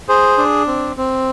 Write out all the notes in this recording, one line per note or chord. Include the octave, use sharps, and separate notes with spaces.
G#4 C5
D4
C4
C4